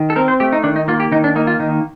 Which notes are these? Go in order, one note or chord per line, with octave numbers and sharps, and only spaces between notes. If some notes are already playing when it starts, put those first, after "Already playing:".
Already playing: D#3
A4
C4 A#4
C5
A3 G4
D#4
D#3 D4
D#4
A#3 F4
G4
D#3 D#4
D4
A#3 D#4
F4
D#3 D#4